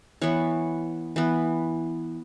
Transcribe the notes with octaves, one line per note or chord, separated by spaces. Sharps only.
E3 B3 C#5
E3 B3